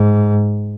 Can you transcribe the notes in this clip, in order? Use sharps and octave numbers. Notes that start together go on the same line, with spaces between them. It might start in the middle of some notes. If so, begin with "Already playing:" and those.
Already playing: G#2